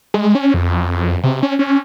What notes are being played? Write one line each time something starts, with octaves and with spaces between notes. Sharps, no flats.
G#3
C#4
F2
C3
C#4
C#4